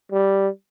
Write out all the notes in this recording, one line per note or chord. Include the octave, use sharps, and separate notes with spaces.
G3